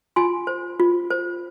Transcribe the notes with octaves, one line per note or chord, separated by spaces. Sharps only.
F4 G#5 C6
C5
F4
C5